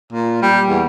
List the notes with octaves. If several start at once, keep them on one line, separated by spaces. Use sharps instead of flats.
A#2
G3
E2